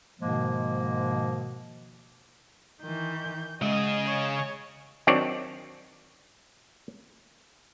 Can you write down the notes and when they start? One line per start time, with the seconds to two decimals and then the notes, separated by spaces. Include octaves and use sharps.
0.20 G#2 B2 D#3 F3 G#3 A#3
2.82 D#3 E3 G6
3.62 C#3 G#3 G#4 D#5 F#5
4.06 C#5
5.07 D#3 F#3 C4 D4 C#5 D5